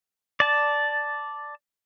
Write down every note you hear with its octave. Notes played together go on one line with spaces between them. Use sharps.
D5 A5